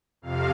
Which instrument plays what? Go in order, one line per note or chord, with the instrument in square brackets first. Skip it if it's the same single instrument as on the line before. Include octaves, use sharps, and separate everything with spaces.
[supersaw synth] F2 C3 F5